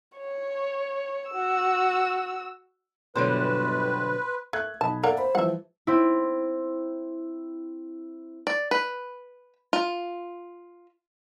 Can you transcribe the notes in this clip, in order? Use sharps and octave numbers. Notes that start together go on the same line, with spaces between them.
C#5
F#4 E6
G1 B2 D3 F#3 B4 C5
A3 E5 F#6 G#6
B1 D#5 A5 B5
A#3 A4 A#4 D5 E5 F#5
C5 B5
E3 F3 G3 E5 F#5
C4 E4
D5
B4
F4